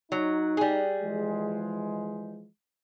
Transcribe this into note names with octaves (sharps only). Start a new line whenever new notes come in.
F#3 D#4
G3 G#4
E3 F3 G#3